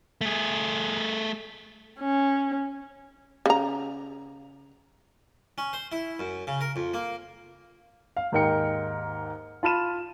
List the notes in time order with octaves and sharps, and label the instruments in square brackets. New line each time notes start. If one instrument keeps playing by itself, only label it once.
[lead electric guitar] A3 G#4
[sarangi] C#4
[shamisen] C#3 A#5
[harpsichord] C#4
C5
E4
F#2
C#3
A#4
F2
A#3
[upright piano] F5
D#2 G#2 D#4 A#4 G5 C#7
F4 A5 B5 F6 D#7 E7